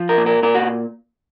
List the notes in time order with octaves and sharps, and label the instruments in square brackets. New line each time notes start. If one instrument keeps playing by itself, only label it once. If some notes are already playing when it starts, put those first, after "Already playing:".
Already playing: [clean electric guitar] F3
A#4
A#2
A#4
A#2 A#4
F#4